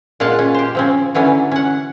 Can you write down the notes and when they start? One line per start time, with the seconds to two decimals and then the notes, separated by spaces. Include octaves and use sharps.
0.20 A#2 G#3 F4 F5 F#5 A5
0.39 C#4
0.54 G4 C5
0.75 F3 C4 C#4
1.14 D3 E3 F#3 C#4
1.51 C#4 F#5